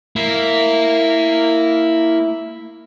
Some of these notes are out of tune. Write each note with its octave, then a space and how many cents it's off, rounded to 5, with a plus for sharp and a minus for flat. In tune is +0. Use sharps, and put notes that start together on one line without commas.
A#3 -15 E4 +0